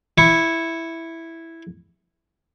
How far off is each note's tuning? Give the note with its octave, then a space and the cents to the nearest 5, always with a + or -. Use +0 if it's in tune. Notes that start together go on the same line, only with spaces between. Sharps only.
E4 +0 C#6 +0